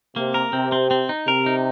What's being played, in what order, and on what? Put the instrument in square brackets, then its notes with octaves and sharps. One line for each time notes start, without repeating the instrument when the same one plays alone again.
[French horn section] C3 [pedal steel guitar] A#3
[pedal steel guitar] A#4
[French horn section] C3 [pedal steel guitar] C4
[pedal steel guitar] C4
C4
D#4
[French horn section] C3 [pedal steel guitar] A#4
[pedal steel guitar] D#4